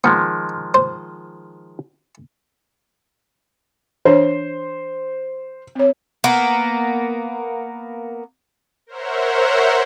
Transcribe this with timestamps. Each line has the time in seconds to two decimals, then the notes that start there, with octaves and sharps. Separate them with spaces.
0.04 D#3 F3 G#3 B3
0.74 C5
4.05 E3 D4 C5 C#5
5.75 C4 C#5
6.24 A#3 B3
8.87 A#4 C5 C#5 E5 F#5